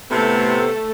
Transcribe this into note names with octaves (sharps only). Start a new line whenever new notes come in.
A2 C3 A3 B3 A4